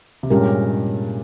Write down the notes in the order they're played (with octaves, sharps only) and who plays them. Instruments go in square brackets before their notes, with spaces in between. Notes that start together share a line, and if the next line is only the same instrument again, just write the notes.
[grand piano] C3
[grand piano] G2 A#2 [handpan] G#3 C#4 G4 A#4